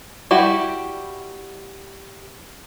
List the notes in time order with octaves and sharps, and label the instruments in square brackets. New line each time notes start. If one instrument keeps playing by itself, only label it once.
[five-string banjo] G3 E4 F#4 G4